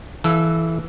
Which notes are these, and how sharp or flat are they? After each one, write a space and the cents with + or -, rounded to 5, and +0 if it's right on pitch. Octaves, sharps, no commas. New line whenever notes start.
E3 +0 A4 -30 F5 +0